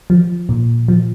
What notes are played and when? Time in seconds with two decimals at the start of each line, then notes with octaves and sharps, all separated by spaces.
0.10 F3
0.49 A#2
0.88 F3